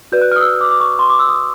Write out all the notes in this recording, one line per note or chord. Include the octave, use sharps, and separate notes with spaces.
F#4 B4 D5 G6
F#6
F6
D#6
E6
D6
D6
C#6
C6
D6
E6
D#6